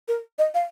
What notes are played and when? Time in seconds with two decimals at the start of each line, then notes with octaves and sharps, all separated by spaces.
0.08 A#4
0.39 D#5
0.54 F5